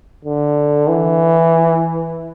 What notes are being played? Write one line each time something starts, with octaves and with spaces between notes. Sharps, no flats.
D3
E3